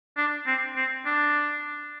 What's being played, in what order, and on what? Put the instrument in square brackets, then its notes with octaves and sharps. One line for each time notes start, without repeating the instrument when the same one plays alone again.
[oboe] D4
C4
C4
D4